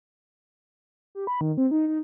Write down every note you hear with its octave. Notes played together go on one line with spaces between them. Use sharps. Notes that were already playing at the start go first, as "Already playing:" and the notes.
G4
B5
D#3
C4
D#4
D#4